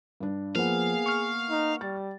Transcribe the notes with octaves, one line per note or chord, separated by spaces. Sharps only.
G2 D4
F3 A#3 B3 G#4 F5 F#5
C#6 F6
D#4
G3 A6